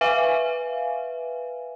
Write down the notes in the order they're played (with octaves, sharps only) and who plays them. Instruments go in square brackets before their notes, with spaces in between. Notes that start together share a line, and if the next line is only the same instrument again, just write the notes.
[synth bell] B4 E5 F5 G#5